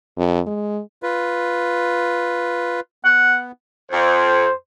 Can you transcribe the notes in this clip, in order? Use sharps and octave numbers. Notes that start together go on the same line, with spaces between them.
F2
G#3
F4 B4
B3 F#5
F2 C5